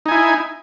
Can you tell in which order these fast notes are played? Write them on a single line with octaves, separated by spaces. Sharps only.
D#4 G#5 E4